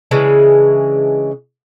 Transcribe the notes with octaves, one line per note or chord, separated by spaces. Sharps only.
C#3 E3 G#3 D4